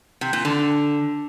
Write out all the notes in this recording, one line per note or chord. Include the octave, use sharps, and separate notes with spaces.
C3
A#2
D3